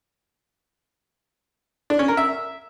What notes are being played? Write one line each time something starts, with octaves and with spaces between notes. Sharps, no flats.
D4
C#4
A#4
E5